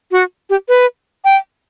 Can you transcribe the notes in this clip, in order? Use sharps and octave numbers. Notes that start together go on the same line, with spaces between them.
F#4
G4
B4
G5